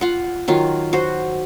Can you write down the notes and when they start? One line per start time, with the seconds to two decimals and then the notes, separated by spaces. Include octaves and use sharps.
0.01 F4 F#5
0.48 D#3 F#3 F4
0.93 F#4 C5